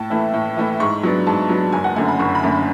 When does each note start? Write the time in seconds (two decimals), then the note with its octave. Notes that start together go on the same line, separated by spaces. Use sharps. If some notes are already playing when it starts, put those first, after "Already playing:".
Already playing: A2 A5
0.10 E3 A3 E4
0.33 A2
0.57 E3 A3 E4
0.80 G#2 C#6
1.03 F#3 B3 D4
1.27 G#2 A5
1.49 F#3 B3 D4
1.72 F#1 G#5
1.84 F#5
1.96 F#2 D3 A3 G#5
2.08 B5
2.19 F#1 C#6
2.35 B5
2.43 F#2 D3 A3